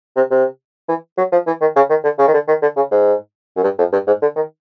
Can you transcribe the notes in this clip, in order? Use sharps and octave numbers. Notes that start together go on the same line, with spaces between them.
C3
C3
E3
F#3
F3
E3
D#3
C#3
D#3
D3
C#3
D#3
D3
D#3
D3
C#3
G#2
F#2
G2
F2
G2
G#2
D3
D#3